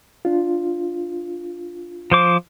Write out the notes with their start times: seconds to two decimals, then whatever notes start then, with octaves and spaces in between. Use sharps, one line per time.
0.25 D4 F4
2.12 F3 C5 D6